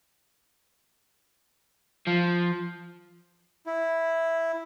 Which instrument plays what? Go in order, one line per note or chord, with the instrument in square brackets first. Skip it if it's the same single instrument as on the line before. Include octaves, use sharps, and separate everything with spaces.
[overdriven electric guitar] F3
[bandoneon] E4